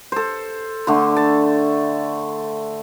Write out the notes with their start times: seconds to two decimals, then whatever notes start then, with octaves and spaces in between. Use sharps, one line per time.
0.12 A4 C5
0.87 D3 A3 C6
1.17 A5